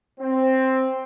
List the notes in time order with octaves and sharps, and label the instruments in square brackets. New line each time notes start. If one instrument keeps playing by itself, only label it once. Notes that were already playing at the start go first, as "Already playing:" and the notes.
[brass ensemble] C4